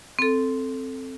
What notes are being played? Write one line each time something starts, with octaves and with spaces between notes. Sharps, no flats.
C4 A4